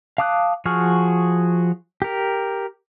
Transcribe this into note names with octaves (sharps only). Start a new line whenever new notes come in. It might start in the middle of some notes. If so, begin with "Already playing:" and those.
F5 A5 D6 D#6 F#6
F3 F#4 G#4 C#6 F6
G4 A#4